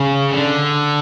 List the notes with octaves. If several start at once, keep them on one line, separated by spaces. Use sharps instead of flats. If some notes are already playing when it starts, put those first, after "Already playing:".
Already playing: C#3
D3